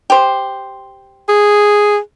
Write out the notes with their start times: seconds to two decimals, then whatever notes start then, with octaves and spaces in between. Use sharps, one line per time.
0.10 G4 C5
1.29 G#4